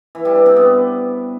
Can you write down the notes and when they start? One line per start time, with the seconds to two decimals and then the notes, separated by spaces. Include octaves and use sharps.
0.15 E3
0.25 G3
0.36 D4
0.46 C3
0.56 B3